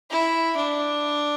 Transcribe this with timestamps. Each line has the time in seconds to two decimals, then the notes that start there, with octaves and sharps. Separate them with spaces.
0.11 E4
0.56 D4